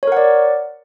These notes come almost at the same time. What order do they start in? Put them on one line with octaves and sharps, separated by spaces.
C#5 A#4 F#5 D5